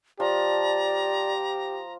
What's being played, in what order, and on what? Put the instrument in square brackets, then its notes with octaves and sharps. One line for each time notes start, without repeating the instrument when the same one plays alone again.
[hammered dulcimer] F3 [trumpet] G4 [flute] D5 [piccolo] A#5